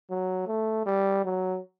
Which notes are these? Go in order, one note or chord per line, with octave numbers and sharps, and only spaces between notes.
F#3
A3
G3
F#3